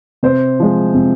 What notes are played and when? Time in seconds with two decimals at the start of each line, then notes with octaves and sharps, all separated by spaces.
0.23 C3 C5
0.60 F3 G#3
0.94 C3